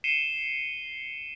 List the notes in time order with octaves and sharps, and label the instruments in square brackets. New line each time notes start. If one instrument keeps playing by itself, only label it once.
[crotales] C7 C#7 D#7 E7 G7